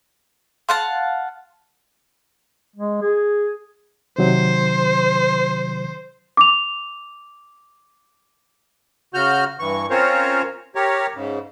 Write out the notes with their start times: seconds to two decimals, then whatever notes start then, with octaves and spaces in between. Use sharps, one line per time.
0.69 F5 F#5 A5 C6
2.76 G#3
3.02 G#4
4.18 C3 D#3 F#3 C5
6.37 D6 F7
9.14 C#3 F#4 F6 G6
9.59 G2 E3 C#6
9.90 C4 C#4 F4 A#4 C5 C#5
10.75 G4 A#4 C#5
11.15 G#2 C#3